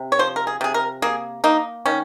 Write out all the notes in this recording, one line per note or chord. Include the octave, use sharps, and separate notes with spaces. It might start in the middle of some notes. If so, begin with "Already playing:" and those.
Already playing: C3
C#5
F3 C5
A#4
G#4
C3 G#4
A#4
A#3 G#4
A#3 D#4
D#3 C#4